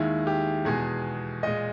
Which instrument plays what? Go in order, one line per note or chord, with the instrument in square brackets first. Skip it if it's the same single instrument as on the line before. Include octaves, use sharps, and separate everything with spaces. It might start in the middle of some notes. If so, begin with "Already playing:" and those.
Already playing: [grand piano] D#2 D#3 G#3 E4
G4
E2 B2 G#3 G#4
A#2 G#3 D#5